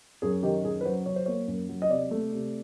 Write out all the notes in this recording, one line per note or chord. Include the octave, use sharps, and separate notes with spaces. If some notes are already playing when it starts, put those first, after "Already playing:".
F#2 G#4
D#3 G4
F#2 G#4
B4
F#3 C5
F#3 C#5
C5
A#3 C#5
F#2
F#3
D#5
C3 D5
A3
C3